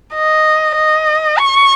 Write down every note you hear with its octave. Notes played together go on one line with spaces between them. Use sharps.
D#5
D#5
C#6